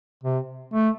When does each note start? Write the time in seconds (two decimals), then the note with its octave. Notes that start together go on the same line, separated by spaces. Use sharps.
0.24 C3
0.74 A3